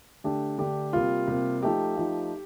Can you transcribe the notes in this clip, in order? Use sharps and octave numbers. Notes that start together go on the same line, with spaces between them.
D3 A3 D4 G4
D3 A3 D4 G4
C3 G3 A#3 F4
C3 G3 A#3
F3 A3 D#4 G4
F3 A3 D#4